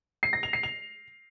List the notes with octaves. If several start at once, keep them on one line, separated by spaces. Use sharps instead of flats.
C7
A#6
F7
C7
F7